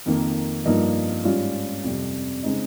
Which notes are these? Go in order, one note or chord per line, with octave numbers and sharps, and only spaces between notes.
F2 D#3 A#3
G2 F3 A#3 D#4
G#2 G3 C#4 F4
F2 C3 G3
C#3 G#3 C4 D#4